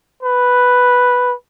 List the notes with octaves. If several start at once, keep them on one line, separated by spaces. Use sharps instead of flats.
B4